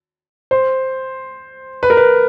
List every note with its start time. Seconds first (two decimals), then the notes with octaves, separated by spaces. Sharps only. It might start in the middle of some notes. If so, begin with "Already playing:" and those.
0.51 C5
1.83 B4
1.90 A#4
1.97 B4